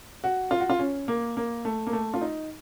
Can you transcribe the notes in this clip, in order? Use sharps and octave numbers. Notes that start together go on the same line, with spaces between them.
F#4
F4
F#4
F4
C#4
A#3
A#3
A3
A#3
A3
F4
D#4